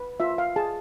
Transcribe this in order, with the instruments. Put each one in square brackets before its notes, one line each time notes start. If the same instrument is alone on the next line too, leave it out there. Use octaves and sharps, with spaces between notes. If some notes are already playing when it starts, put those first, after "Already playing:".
Already playing: [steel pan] B4
F4 E5
F5
G#4 A5